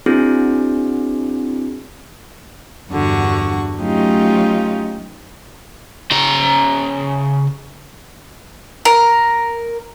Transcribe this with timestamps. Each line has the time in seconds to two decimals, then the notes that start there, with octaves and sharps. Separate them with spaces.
0.06 C4 D4 E4 F#4 G#4
2.90 E2 G2 D3 F#4 C#6
3.79 F#3 A3 C#4 D#4 F4 G4
6.11 C#3 A#5
8.85 A#4